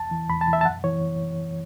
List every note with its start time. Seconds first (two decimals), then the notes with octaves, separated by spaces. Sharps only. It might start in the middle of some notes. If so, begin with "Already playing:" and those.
Already playing: E2 A5
0.11 E3
0.30 E2 B5
0.41 A5
0.47 E3
0.53 E5
0.61 A5
0.65 F#2 F#5
0.84 E3 C#5